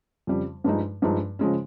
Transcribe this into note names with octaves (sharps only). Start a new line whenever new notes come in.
F2 C#3 G3
G2 F3 G#3 D#4
G2 F3 G#3 D#4
C#3 F3 G#3 C#4